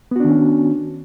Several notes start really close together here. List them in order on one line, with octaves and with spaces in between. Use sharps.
B3 F#4 D4 D#3 C#4